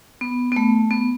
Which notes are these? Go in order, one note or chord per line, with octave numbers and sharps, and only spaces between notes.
B3
B3
A3
B3